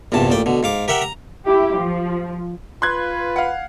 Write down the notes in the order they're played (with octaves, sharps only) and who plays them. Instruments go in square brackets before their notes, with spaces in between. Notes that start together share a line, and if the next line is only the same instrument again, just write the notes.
[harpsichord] A#1 E2 G2 C3 A5
A1 A#2 D5 G5
B2 D3
G#2 F5 D6
G4 A#4 E5 F#5 G5
A#5
[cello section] E4 G4
F3
[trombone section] F4 B4 [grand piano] C6 F#6 G#6
[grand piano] F5 F#5